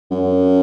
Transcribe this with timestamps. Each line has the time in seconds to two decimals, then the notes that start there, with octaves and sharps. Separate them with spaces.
0.11 F#2